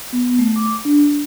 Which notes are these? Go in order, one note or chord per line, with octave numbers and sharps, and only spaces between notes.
B3
A3
D6
D4